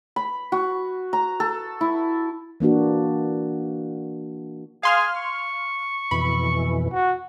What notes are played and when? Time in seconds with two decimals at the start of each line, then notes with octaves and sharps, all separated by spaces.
0.16 B5
0.52 F#4
1.13 A#5
1.40 A4
1.81 E4
2.60 E3 A#3 D4 F#4
4.83 G#4 F5 C6 F6
5.16 C#6
6.11 F2 B2 E3 B5
6.93 F#4